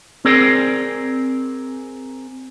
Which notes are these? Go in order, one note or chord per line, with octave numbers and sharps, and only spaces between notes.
C4 G#4 A#4 D5